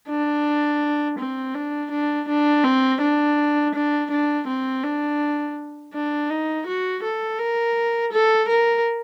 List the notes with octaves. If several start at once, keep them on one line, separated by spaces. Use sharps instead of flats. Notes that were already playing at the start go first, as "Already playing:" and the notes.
D4
C4
D4
D4
D4
C4
D4
D4
D4
C4
D4
D4
D#4
F#4
A4
A#4
A4
A#4